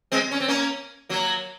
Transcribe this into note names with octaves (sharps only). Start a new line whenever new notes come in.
G#3 C4
C#4
C4
A#3 C#4
F#3 A#3